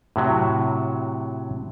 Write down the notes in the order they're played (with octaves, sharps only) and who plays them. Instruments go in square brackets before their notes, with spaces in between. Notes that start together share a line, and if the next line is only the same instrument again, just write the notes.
[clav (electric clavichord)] A2 C3 F#3